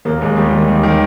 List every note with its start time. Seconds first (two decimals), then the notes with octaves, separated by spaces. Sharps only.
0.05 D#2 A#3
0.21 D#2 G#3
0.36 D#3 G3
0.53 D#3
0.67 D#2
0.83 D#3